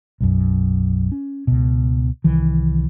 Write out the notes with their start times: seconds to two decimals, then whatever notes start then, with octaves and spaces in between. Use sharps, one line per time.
0.20 B1 F#2
1.12 C#4
1.47 C#2 B2
2.24 C2 D#3 E3